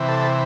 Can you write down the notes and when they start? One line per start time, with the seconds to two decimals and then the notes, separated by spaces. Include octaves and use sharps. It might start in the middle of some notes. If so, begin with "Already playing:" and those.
Already playing: C3 E3
0.09 A4